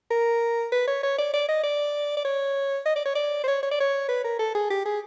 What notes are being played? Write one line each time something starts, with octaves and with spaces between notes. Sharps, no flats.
A#4
B4
C#5
C#5
D5
D5
D#5
D5
D5
C#5
D#5
D5
C#5
D5
C5
C#5
C#5
D5
C#5
B4
A#4
A4
G#4
G4
G#4